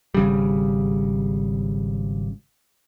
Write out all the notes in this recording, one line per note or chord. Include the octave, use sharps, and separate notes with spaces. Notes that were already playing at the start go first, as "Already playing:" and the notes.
G#1 C#3 G3